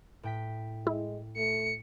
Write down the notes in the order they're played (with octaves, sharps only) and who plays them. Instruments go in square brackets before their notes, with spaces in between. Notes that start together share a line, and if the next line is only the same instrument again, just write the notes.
[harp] A2 G5 B6
[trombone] G#3 [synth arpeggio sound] E4
[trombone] A3 [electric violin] C#7